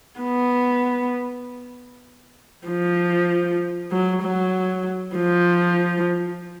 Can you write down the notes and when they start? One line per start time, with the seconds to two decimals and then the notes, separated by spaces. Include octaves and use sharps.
0.21 B3
2.68 F3
3.92 F#3
4.22 F#3
5.15 F3